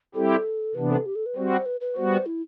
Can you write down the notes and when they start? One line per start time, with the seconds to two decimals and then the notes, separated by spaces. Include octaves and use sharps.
0.15 G3 C4 E4 G4 A4
0.75 C3 E3 B3 D4 B4
0.91 A4
1.06 G4
1.15 A4
1.26 B4
1.36 G3 C4 F#4 C5
1.66 B4
1.81 B4
1.96 G3 B3 F#4 C5
2.26 E4